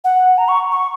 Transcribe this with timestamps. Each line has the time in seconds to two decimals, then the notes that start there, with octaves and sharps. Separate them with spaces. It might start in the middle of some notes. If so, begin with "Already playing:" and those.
0.04 F#5
0.38 A#5
0.48 C#6
0.72 C#6